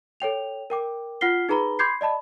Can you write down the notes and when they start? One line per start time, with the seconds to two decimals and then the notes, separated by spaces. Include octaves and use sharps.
0.20 A4 C#5 G5 F7
0.70 A#4 G5 D6
1.21 F4 F#5 F6 B6 C7 G7
1.49 D#4 G#4 B4 A#5 B5 G7
1.79 B5 C6 D6 G6 G#6 C7
2.01 D5 D#5 A5 B5